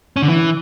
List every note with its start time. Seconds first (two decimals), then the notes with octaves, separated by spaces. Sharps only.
0.16 C#4
0.22 D3
0.28 E3